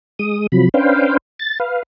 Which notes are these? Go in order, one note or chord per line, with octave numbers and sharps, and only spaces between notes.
G#3 D#6
C3 F3 F#3 B5
C#4 D4 B4 C5 F5 G5
A6
B4 F5